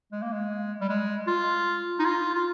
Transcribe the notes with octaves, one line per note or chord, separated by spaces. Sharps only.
G#3
A#3
G#3
G3
G#3
F4
D#4
F4
F4